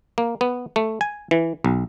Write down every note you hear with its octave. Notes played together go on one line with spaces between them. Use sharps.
A#3
B3
A3
G#5
E3
B1